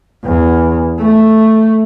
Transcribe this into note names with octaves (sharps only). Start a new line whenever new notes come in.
E2
A3